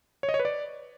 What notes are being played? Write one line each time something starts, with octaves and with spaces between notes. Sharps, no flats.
C#5
D#5
C#5
B4
D5